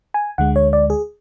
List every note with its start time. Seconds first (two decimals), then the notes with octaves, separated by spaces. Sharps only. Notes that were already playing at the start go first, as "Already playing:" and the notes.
0.14 G#5
0.38 D2 D3 G#3 F#5
0.56 C#5
0.73 D5
0.90 G#4